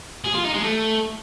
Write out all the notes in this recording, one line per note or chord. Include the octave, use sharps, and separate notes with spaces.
G#4
F4
D#4
G#3
A3